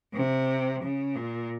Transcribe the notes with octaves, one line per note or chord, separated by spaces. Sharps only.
C3
C#3
A#2